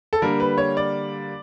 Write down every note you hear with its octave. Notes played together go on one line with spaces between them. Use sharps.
A4
D3 G3 A#3 A#4
B4
C#5
D5